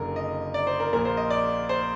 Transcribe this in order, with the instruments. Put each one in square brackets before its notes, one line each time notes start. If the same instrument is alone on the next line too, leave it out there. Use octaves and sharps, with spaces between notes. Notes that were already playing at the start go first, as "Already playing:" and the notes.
Already playing: [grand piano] F#1 F#2 D3 A#4
D#5
D5
C5
A#4
A#1 A#2 A#4
C5
D#5
D5
C5